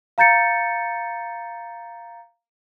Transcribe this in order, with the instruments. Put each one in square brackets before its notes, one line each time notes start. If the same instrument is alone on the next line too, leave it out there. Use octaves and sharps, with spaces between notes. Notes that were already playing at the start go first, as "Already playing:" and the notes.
[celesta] F5 A#5 G6 A6 C#7